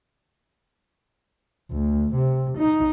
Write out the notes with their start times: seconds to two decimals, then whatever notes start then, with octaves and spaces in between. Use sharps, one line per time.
1.71 D2
2.15 C3
2.58 D#4